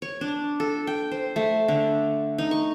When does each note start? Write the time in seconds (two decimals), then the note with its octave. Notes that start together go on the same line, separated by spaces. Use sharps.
0.02 C#5
0.21 D4
0.60 A4
0.87 G5
1.11 C5
1.36 A3
1.68 D3
2.38 D#4
2.51 C#6